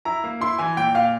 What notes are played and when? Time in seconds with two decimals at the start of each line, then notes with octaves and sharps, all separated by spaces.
0.05 E4 A#5
0.24 A#3
0.41 E4 C6
0.58 E3 G#5
0.77 A#2 G5
0.94 A#2 F5